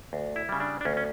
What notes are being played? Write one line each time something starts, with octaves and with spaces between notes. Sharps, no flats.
D2
E4
C#3 G3
D4
D4
D2 C#4
C#4